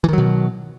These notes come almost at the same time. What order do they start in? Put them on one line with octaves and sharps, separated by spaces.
E3 D#3 F#3 B2